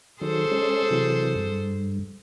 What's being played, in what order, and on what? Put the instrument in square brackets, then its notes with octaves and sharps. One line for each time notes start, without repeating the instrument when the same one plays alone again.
[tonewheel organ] D#3 F#3 [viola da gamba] G#4 A4 C5
[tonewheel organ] G#3 C#4
C3 E3 F#3
G2